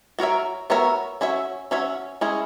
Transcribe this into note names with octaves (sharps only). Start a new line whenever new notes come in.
B3 F#4 A#4 C#5 E5
B3 F#4 A#4 C#5 E5
C#4 F#4 C#5 E5
C#4 F#4 C#5 E5
G#3 C#4 E4 G#4